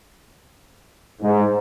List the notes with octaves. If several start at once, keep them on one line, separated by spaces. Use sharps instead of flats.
G#2